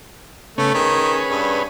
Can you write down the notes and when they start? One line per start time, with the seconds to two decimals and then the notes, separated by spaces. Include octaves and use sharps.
0.58 C#3 A3 B3 C#4
0.74 D#3 C#4 G#4 B4
1.30 G2